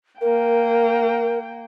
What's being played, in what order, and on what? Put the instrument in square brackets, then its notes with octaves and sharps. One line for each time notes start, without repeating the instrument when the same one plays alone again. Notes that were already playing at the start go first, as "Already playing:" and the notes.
[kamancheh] A#3 G5 [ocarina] A#4